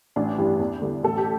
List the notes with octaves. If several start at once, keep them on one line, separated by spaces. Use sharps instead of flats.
A1 D4
G2 E3 G3
E2
D3 G3
A1 A4
G4